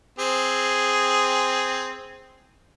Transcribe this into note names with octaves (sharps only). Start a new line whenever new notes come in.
C4 G#4